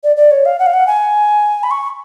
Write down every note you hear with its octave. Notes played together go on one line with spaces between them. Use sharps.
D5
D5
C#5
F5
F#5
F5
F#5
G#5
B5
C#6